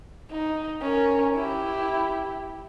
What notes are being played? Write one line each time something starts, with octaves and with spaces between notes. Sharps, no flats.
D#4
C#4 A#4
E4 G4